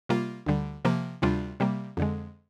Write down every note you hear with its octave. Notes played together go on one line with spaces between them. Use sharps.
C3 G3 A#3 F4
D2 D3 G3
C3 F3 A#3
D2 C3 G3 D4 F4
C3 G3 A#3
F2 D3 G#3